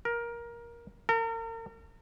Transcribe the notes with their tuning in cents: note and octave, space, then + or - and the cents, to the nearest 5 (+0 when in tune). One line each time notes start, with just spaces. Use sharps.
A#4 +15
A#4 -40